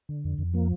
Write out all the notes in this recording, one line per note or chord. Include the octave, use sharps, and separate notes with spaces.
D3
F2
F2
F3 A#3